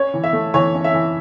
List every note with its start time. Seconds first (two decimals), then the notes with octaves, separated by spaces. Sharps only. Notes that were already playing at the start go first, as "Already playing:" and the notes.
Already playing: C#4 C#5
0.14 E3
0.24 E5
0.33 A3
0.54 E3 C#5
0.75 C#4
0.84 E5
0.94 E3